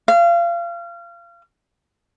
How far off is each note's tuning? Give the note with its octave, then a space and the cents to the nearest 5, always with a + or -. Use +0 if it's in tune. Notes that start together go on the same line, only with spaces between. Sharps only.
F5 -30